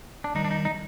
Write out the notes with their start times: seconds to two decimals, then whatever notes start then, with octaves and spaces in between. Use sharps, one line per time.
0.24 D4
0.35 D#3 G3 D#4
0.45 D4
0.51 D#4
0.65 D#4